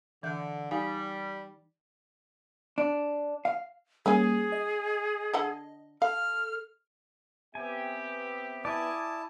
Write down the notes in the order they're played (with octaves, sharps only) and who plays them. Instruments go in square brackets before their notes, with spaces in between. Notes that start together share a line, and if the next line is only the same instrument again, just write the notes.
[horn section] D3 [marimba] E3 G6
[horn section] G3 [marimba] D#4 F5 G#5
[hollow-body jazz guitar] D4
F5
[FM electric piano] G3 A#3 [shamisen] C#4 C#5 G#5 [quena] G#4
[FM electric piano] D#5
[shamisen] D3 A4 F#5
[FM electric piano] A4 [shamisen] F5 [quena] F6
[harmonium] B3 E5 G5 [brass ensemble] C4 G4 [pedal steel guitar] G#5
[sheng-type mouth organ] E4 A5 [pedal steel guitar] D5 D#5 G#5